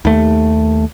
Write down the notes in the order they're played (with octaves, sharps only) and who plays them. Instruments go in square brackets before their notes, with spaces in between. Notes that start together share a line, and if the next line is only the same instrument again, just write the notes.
[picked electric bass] D#2 A3